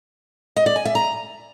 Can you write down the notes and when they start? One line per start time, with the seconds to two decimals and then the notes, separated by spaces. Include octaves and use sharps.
0.56 D#5
0.66 D5
0.76 G#5
0.85 E5
0.95 A#5